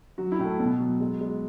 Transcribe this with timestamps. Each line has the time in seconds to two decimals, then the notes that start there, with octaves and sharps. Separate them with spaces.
0.18 F#3 F#4
0.32 E4
0.39 A2
0.45 A3
0.60 B2 B3
0.80 F#3
1.00 G#3
1.21 G#3